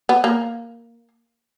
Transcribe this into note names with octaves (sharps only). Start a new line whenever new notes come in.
B3
A#3